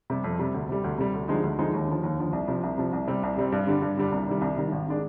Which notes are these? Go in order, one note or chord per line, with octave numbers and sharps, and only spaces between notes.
C3 G3
F2
C3 G3
D2
C3 G3
D2
C3 G3
D2
D3 F3 G#3 D#4
D2
D3 F3 G#3 D#4
D#2
D3 F3
D#2
D3 F3
C2
C3 F3
C2
C3 F3
C2
C3 G3 C4
C2
C3 G3 C4
G2
D3 G3 D4
G2
D3 G3 D4
C2
C3 D#3 G3
C2
C3 D#3 G3
G#1
D#3 G#3 D4